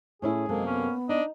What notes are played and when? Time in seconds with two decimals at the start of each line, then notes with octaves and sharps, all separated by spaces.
0.22 A2 C#4 E4 G#4
0.49 F#2 C3 G#3 A#3 A4
0.67 B3 C#4
1.09 D4 D#4 D#5